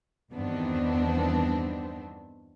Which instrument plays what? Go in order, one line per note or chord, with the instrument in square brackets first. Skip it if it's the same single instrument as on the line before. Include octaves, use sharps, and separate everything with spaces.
[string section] E2 G2 D#3 B3 C4 D4